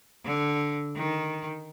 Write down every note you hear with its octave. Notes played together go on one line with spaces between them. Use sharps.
D3
D#3